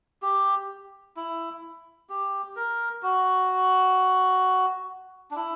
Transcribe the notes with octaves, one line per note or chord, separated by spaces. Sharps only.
G4
E4
G4
A#4
F#4
D4
E4